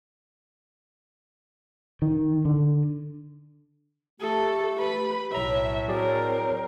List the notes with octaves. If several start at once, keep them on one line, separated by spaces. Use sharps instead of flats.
D#3
D3
A3 G4 A4
B4 B5
B1 A2 C#5 E5 A#5 B5
F#3 C4 G#4 A#4 C#5 D5